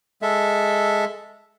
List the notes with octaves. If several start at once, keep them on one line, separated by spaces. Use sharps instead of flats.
G#3 A4 E5